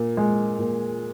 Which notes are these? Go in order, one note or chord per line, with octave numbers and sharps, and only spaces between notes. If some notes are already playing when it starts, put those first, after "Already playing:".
Already playing: A#2
G#3
A#2